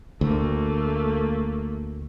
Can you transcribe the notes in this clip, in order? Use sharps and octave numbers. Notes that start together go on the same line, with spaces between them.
D2 A3 A#3